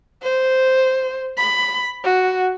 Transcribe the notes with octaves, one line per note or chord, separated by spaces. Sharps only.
C5
B5
F#4